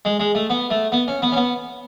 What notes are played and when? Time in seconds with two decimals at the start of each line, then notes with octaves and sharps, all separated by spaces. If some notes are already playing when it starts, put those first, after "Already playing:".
0.05 G#3
0.20 G#3
0.35 A3
0.50 B3
0.70 A3
0.92 B3
1.08 C#4
1.22 B3
1.32 C#4
1.36 B3